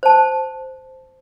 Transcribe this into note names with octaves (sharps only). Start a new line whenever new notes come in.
C5 A5